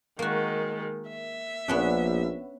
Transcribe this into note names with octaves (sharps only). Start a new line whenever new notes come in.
D#3 G#3 A#3 F#4
E5
A#1 B3 C#4 D4